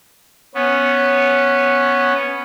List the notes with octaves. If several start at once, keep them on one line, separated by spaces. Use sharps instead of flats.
B3 C#4